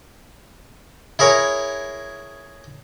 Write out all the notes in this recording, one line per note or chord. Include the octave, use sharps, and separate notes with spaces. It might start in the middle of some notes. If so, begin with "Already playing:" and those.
E4 G#4 A#4 C#5